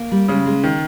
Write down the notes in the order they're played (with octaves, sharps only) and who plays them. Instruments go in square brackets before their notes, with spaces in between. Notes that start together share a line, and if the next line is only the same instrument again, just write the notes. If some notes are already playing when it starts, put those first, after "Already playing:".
Already playing: [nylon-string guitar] A#3
G3
[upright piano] C#3 [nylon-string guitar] G#3
[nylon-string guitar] G#3
[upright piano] D#3